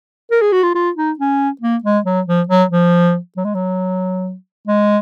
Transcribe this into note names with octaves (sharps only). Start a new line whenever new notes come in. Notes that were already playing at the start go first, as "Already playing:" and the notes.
A#4
G#4
F#4
F4
F4
D#4
C#4
A#3
G#3
F#3
F3
F#3
F3
F#3
G#3
F#3
G#3